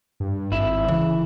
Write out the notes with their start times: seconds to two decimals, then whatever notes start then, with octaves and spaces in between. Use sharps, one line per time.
0.20 G2
0.52 G#1 E4 E5
0.88 C#3 E3